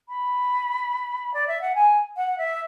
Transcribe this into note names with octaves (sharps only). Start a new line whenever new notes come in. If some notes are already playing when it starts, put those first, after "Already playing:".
B5
D5
E5
F#5
G#5
F#5
E5